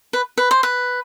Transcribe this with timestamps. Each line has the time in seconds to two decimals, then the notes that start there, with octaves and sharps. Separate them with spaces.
0.13 B4
0.38 B4
0.51 C5
0.63 B4